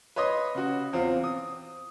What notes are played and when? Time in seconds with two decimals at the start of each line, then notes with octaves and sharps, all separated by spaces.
0.16 B4 C#5 D#5 C6 D#6
0.55 C#3 F#4
0.93 E2 C4 F4
1.24 D#6